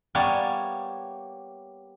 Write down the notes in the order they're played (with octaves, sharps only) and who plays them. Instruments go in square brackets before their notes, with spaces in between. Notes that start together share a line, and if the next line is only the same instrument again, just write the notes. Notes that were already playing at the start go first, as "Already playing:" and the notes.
[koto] G3 A#3 B3 C#5 G#5 A5